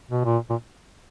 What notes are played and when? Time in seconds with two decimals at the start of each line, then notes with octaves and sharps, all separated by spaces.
0.11 B2
0.24 A#2
0.50 A#2